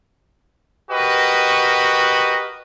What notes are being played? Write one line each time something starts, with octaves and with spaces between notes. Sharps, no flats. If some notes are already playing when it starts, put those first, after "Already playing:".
F#4 G4 A#4 B4 D#5